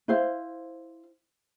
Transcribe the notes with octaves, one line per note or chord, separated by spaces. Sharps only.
E4 C5 F5